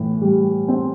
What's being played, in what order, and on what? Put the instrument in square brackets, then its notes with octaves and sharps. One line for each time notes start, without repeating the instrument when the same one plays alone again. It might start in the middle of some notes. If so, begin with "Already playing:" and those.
Already playing: [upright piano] A2 E3
G3
C4